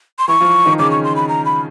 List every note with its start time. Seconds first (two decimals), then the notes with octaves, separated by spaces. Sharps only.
0.19 C6
0.28 E3 E4 C#6
0.41 F3 F4
0.66 D#3 D#4
0.79 C#3 C#4 D6
0.91 C#6
1.04 C6
1.16 B5
1.28 A#5
1.45 B5